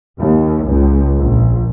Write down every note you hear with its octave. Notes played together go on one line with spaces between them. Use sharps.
D#2
C#2
A#1